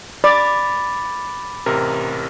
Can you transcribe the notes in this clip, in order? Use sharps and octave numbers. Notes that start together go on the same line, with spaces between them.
D5 B5 D6 A6
A1 C3 A#4